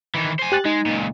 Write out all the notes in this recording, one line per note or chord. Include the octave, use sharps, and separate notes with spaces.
D#3 E3
C5 G#5
G4 F#6 A6
G#3 D#4
C#2 A#2